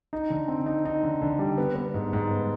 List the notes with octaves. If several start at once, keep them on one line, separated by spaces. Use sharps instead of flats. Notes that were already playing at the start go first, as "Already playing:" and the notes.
D#4
D3
C4
D#4
D#4
D3
D3
G3
B3
B3
G#2
G#2
B3